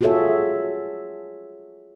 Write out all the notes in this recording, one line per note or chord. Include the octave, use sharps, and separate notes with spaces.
F4 F#4 G#4 A4 C#5 E5